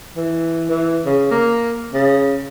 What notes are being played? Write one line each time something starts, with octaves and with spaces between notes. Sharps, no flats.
E3
E3
C#3
A#3
C#3